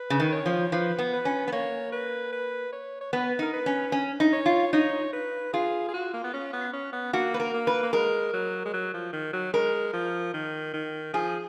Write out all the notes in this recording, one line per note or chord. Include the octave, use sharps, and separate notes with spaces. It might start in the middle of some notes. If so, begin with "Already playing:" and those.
Already playing: B4
C#3
D#3
C#5
F3
F3 B4
B3
B4
C#4
B3
A#3 C#5
B4
B4
C#5
C#5
B3 B4
D#4 A#4
B4
C#4
C#4
D#4
C#5
F4
D#4 C#5
B4
F4 G#4
G#4
F#4
A#3
B3
C#4
B3
C#4
B3
A#3 F#4
B4
A#4
A#3
B4
A#3
G#3 A#4
F#3
G#3
F#3
F3
D#3
F#3
G#3 A#4
F3
D#3
D#3
F3 G#4